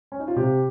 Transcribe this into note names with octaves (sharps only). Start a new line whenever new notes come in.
C#4
D#4
F4
C3 G4